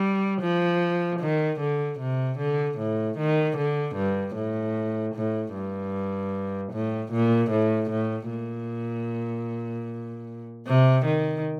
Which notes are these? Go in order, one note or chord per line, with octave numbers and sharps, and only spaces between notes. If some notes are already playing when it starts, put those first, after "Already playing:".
Already playing: G3
F3
D#3
D3
C3
D3
A2
D#3
D3
G2
A2
A2
G2
A2
A#2
A2
A2
A#2
C3
D#3